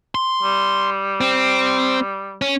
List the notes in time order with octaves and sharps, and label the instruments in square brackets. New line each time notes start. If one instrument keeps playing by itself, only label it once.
[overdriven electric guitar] C6
[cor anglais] G3
[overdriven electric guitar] C4
C#4